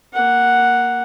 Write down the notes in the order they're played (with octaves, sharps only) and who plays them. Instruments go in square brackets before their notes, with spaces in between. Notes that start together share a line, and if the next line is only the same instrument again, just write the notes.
[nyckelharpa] A#3 F#5